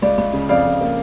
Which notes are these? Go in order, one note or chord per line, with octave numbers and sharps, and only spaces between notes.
C#2 D5
C#2
C#3
F2 D5 F5
F2
A#3